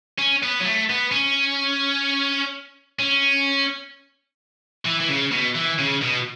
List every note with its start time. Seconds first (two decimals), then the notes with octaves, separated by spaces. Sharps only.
0.18 C#4
0.43 B3
0.60 F#3
0.65 A3
0.89 B3
1.12 C#4
2.99 C#4
4.86 E3
5.01 E3
5.09 C#3
5.32 B2
5.55 E3
5.79 C#3
6.02 B2